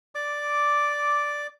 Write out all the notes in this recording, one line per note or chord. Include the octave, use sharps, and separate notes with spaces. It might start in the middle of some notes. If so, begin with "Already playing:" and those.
D5 D6